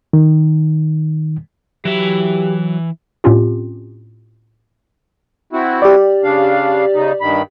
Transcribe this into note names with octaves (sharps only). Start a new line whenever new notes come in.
D#3
E3 F#3 G4 E5
A2 C4 C#4 F4 G4
C4 E4 F#4
G4 D5
C#3 D4 F5
C#3 D#4
G2 D#3 B5